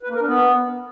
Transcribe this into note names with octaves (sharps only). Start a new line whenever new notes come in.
B4
A#3
A#4
D4
B3